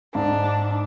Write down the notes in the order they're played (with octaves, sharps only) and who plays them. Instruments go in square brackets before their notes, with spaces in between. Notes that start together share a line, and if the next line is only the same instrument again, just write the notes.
[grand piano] G#2 [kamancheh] D4